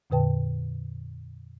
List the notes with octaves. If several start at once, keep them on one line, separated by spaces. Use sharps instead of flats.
F2 A#2 D3 B4 G5 A5